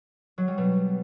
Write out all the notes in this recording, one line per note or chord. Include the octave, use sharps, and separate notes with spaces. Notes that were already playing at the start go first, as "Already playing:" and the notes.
F#3
G3
B2